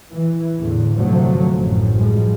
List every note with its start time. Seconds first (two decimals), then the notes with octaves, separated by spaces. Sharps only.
0.13 E3
0.57 E2 A2 D3
0.98 F1 G2 D3 F3 F#3 A3
1.56 A1 F#2 A2
1.94 A2 F3 G3 G#3